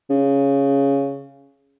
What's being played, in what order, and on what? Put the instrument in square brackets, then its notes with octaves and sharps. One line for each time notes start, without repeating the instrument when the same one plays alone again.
[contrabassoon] C#3